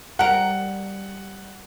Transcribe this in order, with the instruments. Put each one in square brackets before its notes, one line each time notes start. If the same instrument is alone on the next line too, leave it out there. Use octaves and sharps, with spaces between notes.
[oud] G3 A#4 [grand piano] F#5